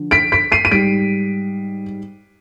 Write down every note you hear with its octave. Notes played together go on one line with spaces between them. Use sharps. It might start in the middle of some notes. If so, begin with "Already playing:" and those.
Already playing: D3 F3
B6 D7
B6 D7
C7 D#7
D#7
G#2 G3 B6 D7